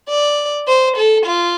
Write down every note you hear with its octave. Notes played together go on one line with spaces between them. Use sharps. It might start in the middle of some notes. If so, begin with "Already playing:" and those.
D5
C5
A4
F4